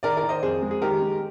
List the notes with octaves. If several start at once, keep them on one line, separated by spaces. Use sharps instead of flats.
D#3 A#4 D5
A#4 D5
D#3
C5 D#5
F2 G#4 C5
G#3
G#4
D#3 G4 A#4
G#3